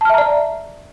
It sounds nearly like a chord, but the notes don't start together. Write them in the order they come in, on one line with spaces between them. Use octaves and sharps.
A5 F6 E5 A#5 D5